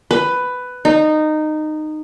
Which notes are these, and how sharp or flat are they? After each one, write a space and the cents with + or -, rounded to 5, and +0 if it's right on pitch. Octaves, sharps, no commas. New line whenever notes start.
B4 +10
D#4 -15